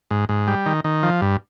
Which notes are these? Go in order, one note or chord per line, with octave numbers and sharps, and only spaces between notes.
G#2
G#2
G3
D#3
D#3
F3
G2